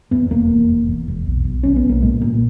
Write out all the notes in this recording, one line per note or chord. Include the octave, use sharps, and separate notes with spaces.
E2 B3
E1 A#3
E2
E1
E2
E1
B1
B1
B1 C#4
B3
B1
A#3
A#2 G#3
A#2 A#3